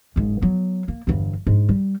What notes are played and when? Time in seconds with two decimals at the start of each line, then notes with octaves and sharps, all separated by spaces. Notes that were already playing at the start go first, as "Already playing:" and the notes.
0.16 F#1 G#2
0.42 F#3 B3
0.88 A#3
1.07 G1 E2
1.47 G#2 D4
1.69 G3